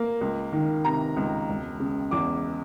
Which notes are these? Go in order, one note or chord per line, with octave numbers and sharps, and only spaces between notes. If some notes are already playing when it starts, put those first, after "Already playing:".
Already playing: A#3
C#2
D#3
C3 A#5
C#2
E1
C#3
E2 D6